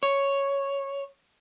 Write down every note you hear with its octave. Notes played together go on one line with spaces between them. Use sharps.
C#5